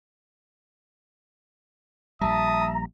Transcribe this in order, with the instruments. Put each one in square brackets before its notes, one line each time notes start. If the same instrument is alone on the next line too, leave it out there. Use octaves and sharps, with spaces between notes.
[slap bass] A#1 G3 [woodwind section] E5 A5 [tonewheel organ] A#5 [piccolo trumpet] D#6